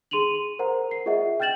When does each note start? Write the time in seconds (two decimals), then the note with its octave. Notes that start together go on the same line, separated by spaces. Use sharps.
0.11 G#4 C6 D#7 F7 F#7
0.59 A#4 C5 F#5 A#5
0.91 C7
1.06 F4 G#4 D#5 E5 F#5
1.40 G5 F6 G6 A6 E7 F#7